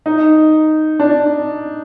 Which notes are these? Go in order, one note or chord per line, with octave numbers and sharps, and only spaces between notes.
D#4
D4